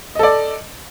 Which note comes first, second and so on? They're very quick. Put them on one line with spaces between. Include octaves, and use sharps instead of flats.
D#5 A4 D5